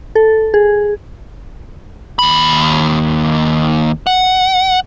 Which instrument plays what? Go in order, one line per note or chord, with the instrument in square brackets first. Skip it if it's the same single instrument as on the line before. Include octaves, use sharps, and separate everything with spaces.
[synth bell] A4
G#4
[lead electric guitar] D#2 B5
F#5